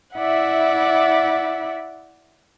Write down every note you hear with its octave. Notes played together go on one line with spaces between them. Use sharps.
E4 D5 E5 F#5